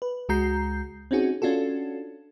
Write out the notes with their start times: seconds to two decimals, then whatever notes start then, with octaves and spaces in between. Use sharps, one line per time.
0.02 B4
0.29 C#2 G#3 F#4 A#5 G6 C7
1.11 C4 C#4 D#4 F#4 G#4
1.42 C#4 D4 F4 F#4 A4